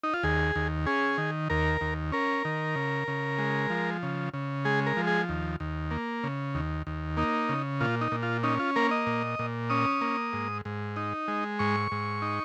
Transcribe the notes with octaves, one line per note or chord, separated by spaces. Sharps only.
D#4
F4
D#2 G#4
D#2
C#4 G#4
D#3
D#2 A#4
D#2
C#4 A#4
D#3
C#3
C#3
G#3
F3
C#3
C#3
G#3 G#4
A#4
F3
G#4
D#2
D#2
A#3
C#3
D#2
D#2
A#3 D#4
C#3
A#2 F4
D#4
A#2
F4
C#4 D#4
F4
A#3 A#4
D#5
A#2
A#2
C#4 D#6
A#3
G#2
G#2
D#4
G#3
G#2 C#6
G#2
D#4